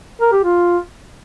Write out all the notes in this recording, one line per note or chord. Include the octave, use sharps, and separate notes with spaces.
A#4
G4
F4